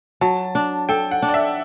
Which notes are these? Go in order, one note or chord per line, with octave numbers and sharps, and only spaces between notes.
F#3 A5
D4
A4 G5
F#5
D4
D5
E5